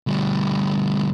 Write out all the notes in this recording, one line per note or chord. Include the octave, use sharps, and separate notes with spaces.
D2 G3